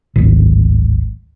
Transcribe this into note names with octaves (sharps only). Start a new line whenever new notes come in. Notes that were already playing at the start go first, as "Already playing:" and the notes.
D1 G#1